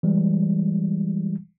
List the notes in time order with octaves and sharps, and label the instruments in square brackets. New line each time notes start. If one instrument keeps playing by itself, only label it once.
[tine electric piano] E3 G3 G#3